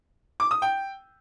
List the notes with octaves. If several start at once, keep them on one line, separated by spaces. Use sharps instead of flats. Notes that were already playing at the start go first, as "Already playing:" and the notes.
D6
D#6
G5